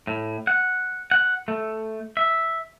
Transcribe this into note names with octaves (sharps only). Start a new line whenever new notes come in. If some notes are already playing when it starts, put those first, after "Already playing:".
A2
F#5
F#5
A3
E5